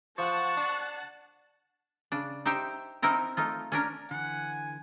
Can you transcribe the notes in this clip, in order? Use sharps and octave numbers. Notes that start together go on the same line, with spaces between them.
F3 F#5 A5 C#6
D4
C#3 D4
D#4 G4 C5 E5 G5
C4 D#4 E4 A#4 C5
A3 D#4 F4
C#4 D4 A#4
D3 E3 F#5 G#5